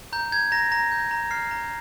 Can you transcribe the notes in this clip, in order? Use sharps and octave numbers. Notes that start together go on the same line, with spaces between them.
A#5 G6
G6 G#6
A#5 A#6
A#5 A#6
G6
A#5
F6 C7
A#5